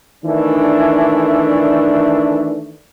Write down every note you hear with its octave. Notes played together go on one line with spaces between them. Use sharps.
D#3 E3 A3 D4